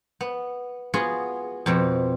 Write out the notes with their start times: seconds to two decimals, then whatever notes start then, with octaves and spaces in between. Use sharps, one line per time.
0.21 B3
0.94 B3 F4 F#4 G#4
1.66 F2 B2 C4